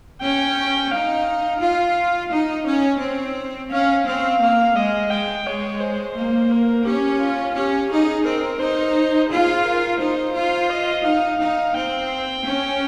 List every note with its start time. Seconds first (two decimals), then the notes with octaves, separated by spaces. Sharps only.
0.21 C#4 G5
0.91 D#4 F5
1.61 F4 F5
2.31 D#4 D#5
2.66 C#4 C#5
3.01 C4
3.70 C#4 F5
4.06 C4 F5
4.41 A#3
4.75 G#3 D#5
5.10 G#3 G5
5.45 G#3 C#5
5.81 C5
6.15 A#3
6.51 A#4
6.85 C#4 G4
7.20 F4
7.55 C#4 G4
7.90 D#4 G#4
8.24 C4 A#4
8.59 D#4 C5
9.29 F4 G#4
9.65 A#4
9.99 D#4 C5
10.35 F4
10.69 D#5
11.04 D#4 F5
11.39 D#4
11.74 C4 G5
12.44 C#4